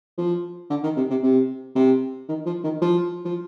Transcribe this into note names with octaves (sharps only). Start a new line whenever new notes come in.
F3
D3
D#3
C3
C3
C3
C3
D#3
F3
D#3
F3
F3